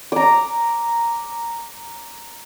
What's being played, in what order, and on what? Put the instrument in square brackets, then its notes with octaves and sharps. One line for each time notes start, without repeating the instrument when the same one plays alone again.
[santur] A#5 D6